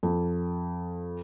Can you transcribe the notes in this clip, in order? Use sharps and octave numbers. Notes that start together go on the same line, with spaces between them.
F2